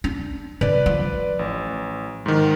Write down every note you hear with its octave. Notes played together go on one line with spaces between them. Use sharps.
D4
D3 B4 D5
F3
A1
G#2 D#3